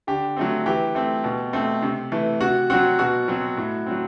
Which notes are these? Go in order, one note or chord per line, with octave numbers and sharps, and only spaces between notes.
D3 G4
F#3 A3 C4
E3 G4
A3 C4
B2
A3 C4
C3
E3 A3
C3 F#4
F#3 C4 F#4
B2 F#4
F#3 C4
A2
F#3 C4